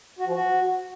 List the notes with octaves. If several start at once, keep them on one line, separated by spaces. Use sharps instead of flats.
F#4
F3
F#4